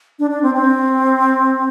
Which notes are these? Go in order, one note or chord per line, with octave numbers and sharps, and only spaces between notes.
D4
D4
C4
C4